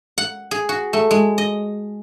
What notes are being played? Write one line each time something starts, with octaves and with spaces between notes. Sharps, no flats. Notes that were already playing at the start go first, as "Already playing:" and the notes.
F#5
G#4
F#4
A3
G#3
D#5